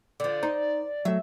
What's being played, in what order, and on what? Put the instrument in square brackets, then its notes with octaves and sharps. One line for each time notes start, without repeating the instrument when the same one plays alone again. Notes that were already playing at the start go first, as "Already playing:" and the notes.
[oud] D3 F3 [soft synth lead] D5
[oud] D#4 [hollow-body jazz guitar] C5
[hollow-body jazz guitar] F#3 A3 [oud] E5